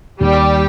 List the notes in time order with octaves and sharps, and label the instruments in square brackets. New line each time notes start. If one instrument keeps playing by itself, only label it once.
[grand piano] D#2 [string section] G3 G4